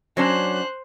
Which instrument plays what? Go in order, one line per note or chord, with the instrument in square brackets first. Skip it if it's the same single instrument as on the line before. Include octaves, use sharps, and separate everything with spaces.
[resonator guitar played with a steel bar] F#3 C#4 D4 [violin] C5 F#6